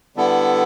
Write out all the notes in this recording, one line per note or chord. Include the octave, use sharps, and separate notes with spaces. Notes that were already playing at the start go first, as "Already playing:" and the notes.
D3 G3 B3 E4 A4